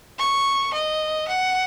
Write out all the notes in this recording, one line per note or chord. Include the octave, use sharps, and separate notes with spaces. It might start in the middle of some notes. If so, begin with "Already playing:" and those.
C#6
D#5
F#5